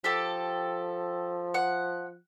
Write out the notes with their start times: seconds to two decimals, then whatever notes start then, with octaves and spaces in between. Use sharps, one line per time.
0.04 F3 G4 A4
1.54 F#5